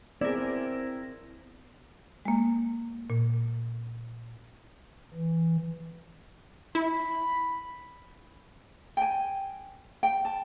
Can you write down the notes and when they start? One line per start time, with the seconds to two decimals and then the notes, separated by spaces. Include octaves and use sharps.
0.21 B3 C4 E4 G#4 A#4 D5
2.25 G#3 A#3
3.10 A#2
5.14 E3
6.75 E4 B5
8.97 G5 G#5
10.03 G5
10.25 A5